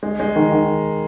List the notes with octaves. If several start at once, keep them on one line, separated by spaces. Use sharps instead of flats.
G#3
G#3
D#3
D#3